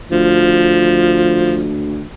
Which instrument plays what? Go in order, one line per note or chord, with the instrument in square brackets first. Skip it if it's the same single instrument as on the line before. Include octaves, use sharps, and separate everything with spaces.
[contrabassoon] D2 [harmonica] F3